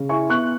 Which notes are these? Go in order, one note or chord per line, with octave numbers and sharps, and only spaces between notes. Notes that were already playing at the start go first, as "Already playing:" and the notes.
Already playing: C#3
E4 G#5 C#6
B3 C#6 F#6